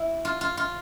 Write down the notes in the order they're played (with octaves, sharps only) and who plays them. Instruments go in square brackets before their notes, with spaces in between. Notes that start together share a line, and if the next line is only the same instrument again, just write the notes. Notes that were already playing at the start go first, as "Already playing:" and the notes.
Already playing: [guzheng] E4
F4
F4
F4